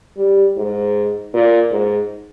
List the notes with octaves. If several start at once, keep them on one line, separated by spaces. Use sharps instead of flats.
G3
G#2
A#2
G#2